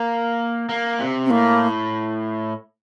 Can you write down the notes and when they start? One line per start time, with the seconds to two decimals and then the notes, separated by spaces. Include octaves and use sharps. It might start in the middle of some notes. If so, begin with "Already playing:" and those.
Already playing: A#3
0.69 A#3
0.99 C3
1.26 C4
1.30 A2 A#3